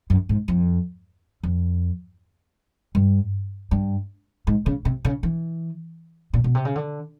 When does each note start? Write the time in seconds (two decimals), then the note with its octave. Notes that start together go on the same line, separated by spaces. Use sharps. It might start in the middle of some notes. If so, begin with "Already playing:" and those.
0.10 F#2
0.29 G#2
0.48 F2
1.43 F2
2.95 G2
3.71 G2
4.47 G#2
4.66 C#3
4.85 C3
5.05 C#3
5.23 E3
6.33 A#2
6.44 B2
6.55 C3
6.65 C#3
6.75 D3